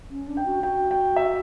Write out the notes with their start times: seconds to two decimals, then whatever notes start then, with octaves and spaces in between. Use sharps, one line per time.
0.10 C#4
0.28 D4
0.37 G5
0.46 F#4
0.63 F#4 G5
0.91 G5
1.16 E5